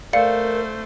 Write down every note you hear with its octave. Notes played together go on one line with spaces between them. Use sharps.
A3 A#4 C5 D5 F5 C#7